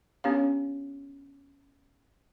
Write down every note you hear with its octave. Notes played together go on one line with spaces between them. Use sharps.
B3 C#4 D4 G4 C#5 F5